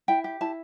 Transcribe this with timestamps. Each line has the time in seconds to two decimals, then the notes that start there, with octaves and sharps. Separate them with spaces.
0.08 E4 G5
0.24 G4
0.41 E4 A5